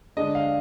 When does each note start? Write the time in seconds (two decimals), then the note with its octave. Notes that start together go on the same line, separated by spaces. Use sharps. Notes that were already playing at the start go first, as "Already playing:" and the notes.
0.17 D3 G#3 D4 D#5
0.35 F5